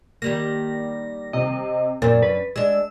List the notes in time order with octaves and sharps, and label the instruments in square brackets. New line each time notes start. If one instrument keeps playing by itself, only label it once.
[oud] D#3 G3 A#3 [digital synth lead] A#6
[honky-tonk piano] C3 C4 [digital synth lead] D#5
[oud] F#2 D4 [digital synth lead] A#2 [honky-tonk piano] A6
[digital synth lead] B4
[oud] G#3 D4 [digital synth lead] E6